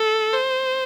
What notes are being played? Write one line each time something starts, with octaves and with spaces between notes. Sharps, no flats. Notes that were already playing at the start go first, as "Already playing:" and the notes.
Already playing: A4
C5